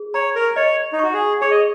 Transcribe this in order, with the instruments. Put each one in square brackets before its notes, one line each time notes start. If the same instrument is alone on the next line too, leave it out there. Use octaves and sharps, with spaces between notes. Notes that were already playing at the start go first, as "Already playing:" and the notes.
Already playing: [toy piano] G#4
[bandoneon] C#5 [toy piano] A#5
[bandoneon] A#4
[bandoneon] C#5 [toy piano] D#5
[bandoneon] D#4
[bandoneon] F#4 [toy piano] C#6
[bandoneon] G#4
[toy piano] G#4 [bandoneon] C#5
[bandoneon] D#5